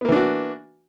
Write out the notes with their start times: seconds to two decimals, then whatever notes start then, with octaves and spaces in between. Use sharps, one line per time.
0.01 B3
0.05 A#3
0.09 E3
0.12 D4
0.16 F#4